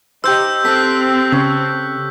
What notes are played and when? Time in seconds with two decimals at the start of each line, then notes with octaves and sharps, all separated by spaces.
0.24 D#4 G4 C5 E6 G6
0.65 C4 A4 F#6 B6
1.32 C#3 C#5